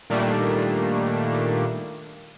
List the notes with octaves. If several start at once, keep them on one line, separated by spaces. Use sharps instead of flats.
A#2 D#3 G3 A3 A#3 D4